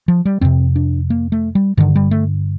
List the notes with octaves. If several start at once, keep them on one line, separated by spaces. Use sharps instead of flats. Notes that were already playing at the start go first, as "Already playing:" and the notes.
F3
G3
F2 C3 C4
D4
A#3
A3
G3
G2 D3 D#3
G3
A3